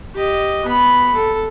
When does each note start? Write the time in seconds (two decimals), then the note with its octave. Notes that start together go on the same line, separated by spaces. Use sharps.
0.16 G4 D#5
0.66 B3 B5
1.15 A4